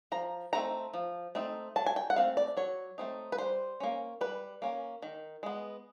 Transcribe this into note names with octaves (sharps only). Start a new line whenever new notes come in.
F3 A#5
A3 C4 D#4 A#5
F3
A3 C4 D#4
F#3 A5
G#5
G5
F#5
A3 C4 F5
D5
F#3 C#5
A3 C4 D#4
B4
G3 C5
A#3 C#4
G3 B4
A#3 C#4
D#3
G#3 B3